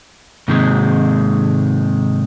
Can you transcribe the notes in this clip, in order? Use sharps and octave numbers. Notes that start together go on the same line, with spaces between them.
G#2 C3 D#3 G#3